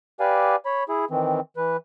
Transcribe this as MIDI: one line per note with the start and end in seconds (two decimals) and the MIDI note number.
0.20 0.56 67
0.20 0.56 71
0.20 0.56 74
0.20 0.56 77
0.20 0.56 80
0.66 0.84 73
0.66 0.84 83
0.89 1.05 64
0.89 1.05 68
1.11 1.40 51
1.11 1.40 52
1.11 1.40 60
1.57 1.77 52
1.57 1.77 71